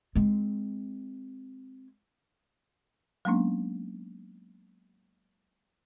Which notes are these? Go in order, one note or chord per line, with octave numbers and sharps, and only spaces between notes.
G#3 C4
F#3 G#3 A#3 B3 C#4 D4